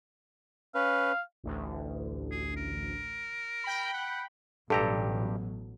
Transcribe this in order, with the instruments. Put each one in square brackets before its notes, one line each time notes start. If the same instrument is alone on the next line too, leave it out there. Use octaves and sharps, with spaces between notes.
[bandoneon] C#4 B4 [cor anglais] F5
[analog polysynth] A1 D2
[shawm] G#4
A#4
[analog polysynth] G5 B5
[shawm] F#5
[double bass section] A1 B2 F#3 [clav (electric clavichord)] G2 G4 A#5 [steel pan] A4